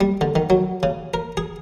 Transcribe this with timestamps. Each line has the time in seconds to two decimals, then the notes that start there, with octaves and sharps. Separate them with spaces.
0.01 G3
0.21 D3
0.35 D#3
0.50 F#3
0.83 C#3
1.14 A#4
1.37 G#4